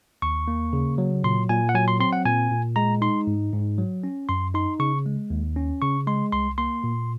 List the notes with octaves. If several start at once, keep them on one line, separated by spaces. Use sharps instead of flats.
D#2 C#6
A#3
C#3
F#3
A#2 C6
A#2 G#5
F#5
F#3 G#5
C6
C4 C6
F#5
A#2 G#5
A#2
G#3 A#5
D#4 C6
G#2
G#2
F#3
C#4
F#2 C6
D#4 C6
C#3 C#6
G#3
D#2
C#4
C#3 C#6
G#3 C6
C2 C6
A#3 C6
A#2